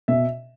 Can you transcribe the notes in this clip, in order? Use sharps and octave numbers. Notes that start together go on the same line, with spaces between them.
B2 E5